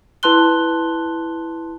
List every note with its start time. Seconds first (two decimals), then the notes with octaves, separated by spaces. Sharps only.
0.23 E4 B4 A5 C6 F#6 G7